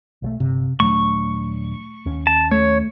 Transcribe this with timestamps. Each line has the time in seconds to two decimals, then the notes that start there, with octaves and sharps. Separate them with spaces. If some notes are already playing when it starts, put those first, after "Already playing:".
0.22 B1 F#3 A3
0.40 G1 C3
0.80 D#1 F#3 A3 D4 C#6
2.06 D#2 C#4
2.27 A5
2.51 A3 C#5